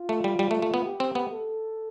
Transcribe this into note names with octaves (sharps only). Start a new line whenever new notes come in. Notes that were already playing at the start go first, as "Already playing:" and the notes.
Already playing: F4
A3
G3
G3
A3
A3
B3
G4
C4
B3
A4